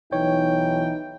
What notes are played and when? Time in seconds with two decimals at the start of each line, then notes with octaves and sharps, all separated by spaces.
0.13 B1 E3 D#4 C#5 G5